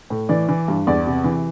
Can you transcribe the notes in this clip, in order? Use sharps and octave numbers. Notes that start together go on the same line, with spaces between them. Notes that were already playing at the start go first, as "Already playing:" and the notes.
A2
E3 D5
E3
G2
E2 D5
C3
E3